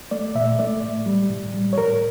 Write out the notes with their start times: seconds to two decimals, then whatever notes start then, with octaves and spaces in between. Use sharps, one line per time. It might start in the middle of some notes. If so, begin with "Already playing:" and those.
0.11 A3 D5
0.35 A#2 E5
0.59 A3 D5
0.83 A2
1.06 G3
1.30 A2
1.54 G3
1.73 C#5
1.78 A2 A#4